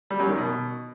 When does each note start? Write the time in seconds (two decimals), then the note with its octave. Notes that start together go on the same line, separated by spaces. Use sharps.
0.10 G3
0.20 F#2
0.29 D#3
0.38 B2